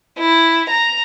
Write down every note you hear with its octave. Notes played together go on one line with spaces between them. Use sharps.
E4
A#5